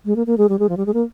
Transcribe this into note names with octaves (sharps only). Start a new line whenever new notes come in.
G#3
A#3
A#3
G#3
G3
G#3
F3
G3
G#3
A#3